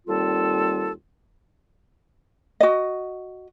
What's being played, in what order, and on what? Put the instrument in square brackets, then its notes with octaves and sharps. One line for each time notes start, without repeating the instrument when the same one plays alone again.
[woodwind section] D#2 G3 C4 F4 A4
[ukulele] F#4 D#5